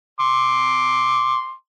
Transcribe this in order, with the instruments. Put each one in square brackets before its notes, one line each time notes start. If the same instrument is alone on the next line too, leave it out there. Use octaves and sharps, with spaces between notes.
[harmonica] C6 D6